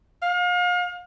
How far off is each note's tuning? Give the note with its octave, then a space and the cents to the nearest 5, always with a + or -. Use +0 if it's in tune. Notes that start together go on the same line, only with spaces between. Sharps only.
F5 +35